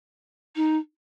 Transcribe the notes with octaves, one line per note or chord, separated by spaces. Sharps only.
D#4